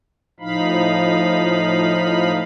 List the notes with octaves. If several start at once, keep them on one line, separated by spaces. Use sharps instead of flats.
A2 F3 D#4 F5 B5